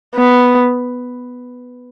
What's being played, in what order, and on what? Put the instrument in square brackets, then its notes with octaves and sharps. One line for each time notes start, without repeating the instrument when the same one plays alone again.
[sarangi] B3